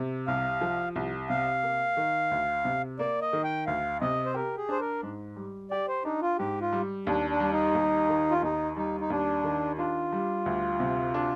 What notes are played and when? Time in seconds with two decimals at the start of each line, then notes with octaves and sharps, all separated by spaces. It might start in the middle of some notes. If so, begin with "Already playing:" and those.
Already playing: C3
0.27 C2 F5
0.61 F3
0.96 C2
1.29 C3 F5
1.63 A#3
1.97 D#3
2.31 D2
2.65 C3
2.99 A#3 D5
3.22 D#5
3.33 D#3
3.44 G5
3.67 D2 F5
4.01 C3 D#5
4.26 C5
4.34 G4 A#4
4.57 G#4
4.69 D4 C5
4.81 A#4
5.03 G#2
5.36 G3
5.71 G4 D5
5.88 C5
6.05 D4 D#4
6.22 F4
6.39 G#2 G4
6.61 F4
6.73 G3
7.07 D#2 D4
7.30 D4
7.40 G3
7.52 D#4
7.75 D#2
8.09 D#3
8.31 F4
8.42 D#2 D#4
8.76 G3 D#4
9.01 D#4
9.10 D#2 D4
9.44 D#3
9.78 D4 F4
10.13 G3
10.46 D2
10.80 C3
11.14 D4